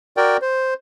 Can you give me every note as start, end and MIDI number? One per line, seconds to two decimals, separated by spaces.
0.17 0.37 66
0.17 0.37 70
0.17 0.37 74
0.17 0.37 79
0.42 0.74 72